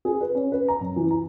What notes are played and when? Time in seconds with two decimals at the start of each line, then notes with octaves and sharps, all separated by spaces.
0.05 G#4
0.21 B4
0.35 C#4
0.52 B4
0.68 A#5
0.81 F#2
0.96 E3
1.11 A#5